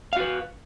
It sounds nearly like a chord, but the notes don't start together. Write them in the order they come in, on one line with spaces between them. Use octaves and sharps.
F5 F#4 B4